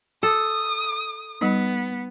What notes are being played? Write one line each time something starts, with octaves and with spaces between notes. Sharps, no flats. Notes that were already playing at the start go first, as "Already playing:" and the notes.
A4 D#6
G3 B3 D#4